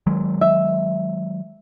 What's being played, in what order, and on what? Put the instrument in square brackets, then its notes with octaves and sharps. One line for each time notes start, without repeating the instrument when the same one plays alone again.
[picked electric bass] D#3 F#3 G#3
[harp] E5